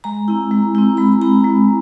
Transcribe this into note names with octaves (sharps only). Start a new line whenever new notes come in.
G#3 A#5
C4 E4
G#3
C4 E4
G#3 B5
C4 E4 A#5
G#3